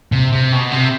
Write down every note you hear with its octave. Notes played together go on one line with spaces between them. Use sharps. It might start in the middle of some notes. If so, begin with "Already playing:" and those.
C3
C3
B2
C3